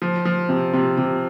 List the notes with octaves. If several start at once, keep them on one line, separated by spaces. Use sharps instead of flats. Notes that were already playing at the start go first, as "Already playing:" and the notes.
F3
F3
C3
C3
C3